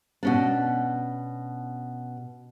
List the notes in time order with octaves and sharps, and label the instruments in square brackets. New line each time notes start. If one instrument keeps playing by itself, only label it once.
[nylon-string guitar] B2 C#4 D4